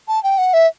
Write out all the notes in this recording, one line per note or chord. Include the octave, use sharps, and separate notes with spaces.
A5
G5
F#5
E5